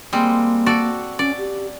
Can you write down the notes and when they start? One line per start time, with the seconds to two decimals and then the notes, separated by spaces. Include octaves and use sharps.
0.13 G3 G#3 A#3 C4
0.66 F#4 A4 D5
1.19 C#4 D5
1.38 G4